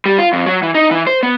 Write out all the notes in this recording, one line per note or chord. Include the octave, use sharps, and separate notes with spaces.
G3
F4
F2
F#3
E3
D#4
E3
C5
B3